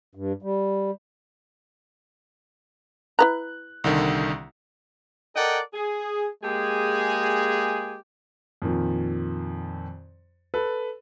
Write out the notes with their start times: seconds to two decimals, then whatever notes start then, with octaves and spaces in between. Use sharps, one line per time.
0.15 G2
0.42 G3
3.19 E4 B4 A#5 F#6
3.84 C2 D3 D#3
5.36 A4 A#4 D5 D#5 F#5 G5
5.74 G#4
6.43 G#3 A#3 G4 G#4
8.62 F2 A#2 D#3
10.54 A4 B4